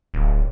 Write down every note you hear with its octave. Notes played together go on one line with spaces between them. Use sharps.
D1